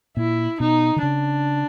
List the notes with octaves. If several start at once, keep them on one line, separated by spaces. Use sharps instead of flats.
A#2 E4
B2 D#4
D3
C#3 D4